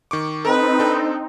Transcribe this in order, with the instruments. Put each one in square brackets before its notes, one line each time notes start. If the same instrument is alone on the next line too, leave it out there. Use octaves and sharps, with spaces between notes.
[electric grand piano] D#3 C#6 D6
[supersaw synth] C4 D#4 [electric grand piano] A4 [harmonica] B4
[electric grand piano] D4 A4 G5